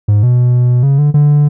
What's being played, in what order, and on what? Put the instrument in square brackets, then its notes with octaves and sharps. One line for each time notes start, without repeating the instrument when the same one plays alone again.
[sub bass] G#2
B2
C#3
D3
D3